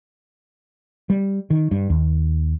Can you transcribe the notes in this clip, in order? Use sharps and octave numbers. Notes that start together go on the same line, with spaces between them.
G3
D#3
G2
D#2